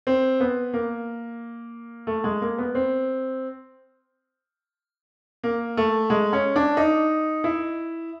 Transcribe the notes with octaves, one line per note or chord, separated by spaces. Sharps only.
C4
B3
A#3
A3
G#3
A#3
B3
C4
A#3
A3
G#3
C#4
D4
D#4
E4